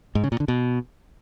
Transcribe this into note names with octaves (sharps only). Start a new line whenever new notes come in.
G#2
C#3
A#2
D3
B2